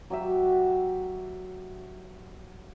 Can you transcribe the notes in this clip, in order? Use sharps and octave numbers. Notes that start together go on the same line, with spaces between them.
F#3 G4 E5